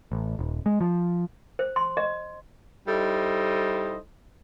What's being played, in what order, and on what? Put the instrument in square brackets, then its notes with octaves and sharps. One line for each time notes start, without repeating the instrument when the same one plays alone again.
[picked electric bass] A1
D#1
G#3
F3
[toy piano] C5
C6
D#5
[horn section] G3 D#4 E4 A4 C5 D#5